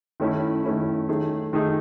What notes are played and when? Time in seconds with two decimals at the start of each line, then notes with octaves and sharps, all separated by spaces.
0.20 D#3 A3 C#4 E4
0.64 D#3 A3 C#4 E4
1.09 D#3 A3 D#4 G#4
1.53 D#3 A3 D#4 G#4